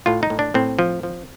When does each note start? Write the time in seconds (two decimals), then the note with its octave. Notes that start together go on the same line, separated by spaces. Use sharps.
0.06 A2 F4
0.23 D#4
0.30 A2
0.39 D4
0.54 A2 C4
0.79 F3
1.03 F3